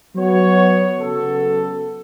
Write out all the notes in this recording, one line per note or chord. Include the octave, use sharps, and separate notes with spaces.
F#3 B3 F#4 C#5
C#3 F#3 B3 F#4 A4